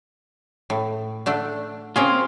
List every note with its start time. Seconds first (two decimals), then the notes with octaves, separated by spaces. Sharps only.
0.70 A2
1.26 D3 A3 D4
1.96 A#3 C4 C#4 F4 G#4